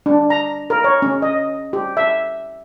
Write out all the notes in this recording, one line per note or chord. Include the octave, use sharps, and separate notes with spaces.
D4
A#5
A#4
C#5
C#4
D#5
G4
E5